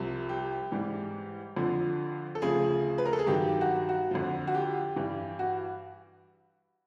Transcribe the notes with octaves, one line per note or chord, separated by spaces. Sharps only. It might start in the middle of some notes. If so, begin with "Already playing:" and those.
Already playing: C2 C3 F3
G4
G#2 E3 G3
F2 D3 F3
A4
D2 C#3 F3 G#4
B4
A#4
A4
G#4
G2 D#3 F#3 G4
G4
F#4
F#4
F2 D3 F3
F#4
G4
G2 E3 G3
F#4